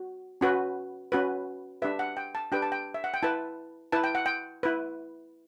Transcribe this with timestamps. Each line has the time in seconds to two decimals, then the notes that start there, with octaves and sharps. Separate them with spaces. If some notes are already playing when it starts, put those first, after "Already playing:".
Already playing: F#4
0.41 C#4 F#4 B4
1.12 C#4 F#4 B4
1.82 D4 G4 B4 E5
1.99 F#5
2.17 G5
2.35 A5
2.52 D4 G4 B4 G5
2.62 A5
2.72 G5
2.94 E5
3.04 F#5
3.14 G5
3.23 E4 B4 A5
3.92 E4 B4 A5
4.04 G5
4.15 F#5
4.26 G5
4.63 E4 B4